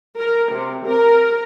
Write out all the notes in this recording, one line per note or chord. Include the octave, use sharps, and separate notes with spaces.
A#4
C3
A#4